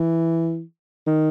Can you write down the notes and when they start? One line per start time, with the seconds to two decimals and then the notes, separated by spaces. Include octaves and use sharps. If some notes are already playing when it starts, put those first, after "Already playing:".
Already playing: E3
1.07 D#3